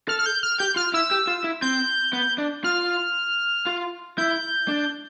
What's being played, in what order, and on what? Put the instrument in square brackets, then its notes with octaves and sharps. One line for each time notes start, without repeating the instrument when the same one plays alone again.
[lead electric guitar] A4 [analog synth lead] F6
[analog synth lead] F6
G6
F6
[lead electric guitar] G4 [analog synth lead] G6
[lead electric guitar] F4 [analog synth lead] F6
[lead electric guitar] E4 [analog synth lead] E6
[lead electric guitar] G4
F4
E4
[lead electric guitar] C4 [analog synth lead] G6
[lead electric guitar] B3
D4
[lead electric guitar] F4 [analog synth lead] F6
[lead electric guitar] F4
[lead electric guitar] E4 [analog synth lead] G6
[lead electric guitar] D4